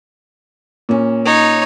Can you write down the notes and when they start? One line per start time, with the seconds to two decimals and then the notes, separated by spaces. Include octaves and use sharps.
0.89 A#2 C#4
1.25 D#4 C#5